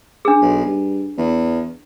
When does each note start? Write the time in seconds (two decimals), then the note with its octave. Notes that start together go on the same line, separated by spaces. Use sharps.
0.25 D4 G#4
0.42 B1
0.66 G2
1.18 E2